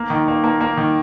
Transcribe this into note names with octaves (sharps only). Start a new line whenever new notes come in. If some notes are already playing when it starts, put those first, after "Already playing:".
Already playing: A#3
D#3
A#3
A#3
A#3
D#3